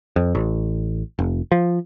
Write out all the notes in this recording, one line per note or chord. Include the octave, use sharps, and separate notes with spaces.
F2
A1
F1
F3